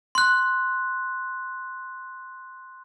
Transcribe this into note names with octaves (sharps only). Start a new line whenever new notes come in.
C6 F#6